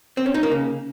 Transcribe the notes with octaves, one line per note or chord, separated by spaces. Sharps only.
C4
C#4
D#4
A#3
C#3